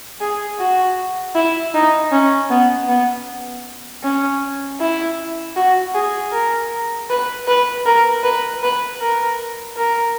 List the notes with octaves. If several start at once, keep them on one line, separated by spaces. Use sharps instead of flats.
G#4
F#4
E4
D#4
C#4
B3
B3
C#4
E4
F#4
G#4
A#4
B4
B4
A#4
B4
B4
A#4
A#4